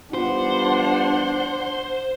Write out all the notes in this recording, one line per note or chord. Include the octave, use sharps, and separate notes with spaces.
G3 B3 D4 F4 C5 F#5